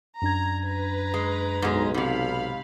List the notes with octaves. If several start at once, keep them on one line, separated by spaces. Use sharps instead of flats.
F#2 D4 A#5 G#6
B4 A#5
G#3
B1 G#2 G#3
G#2 C3 F5 B5